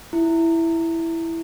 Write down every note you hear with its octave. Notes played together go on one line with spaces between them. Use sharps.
E4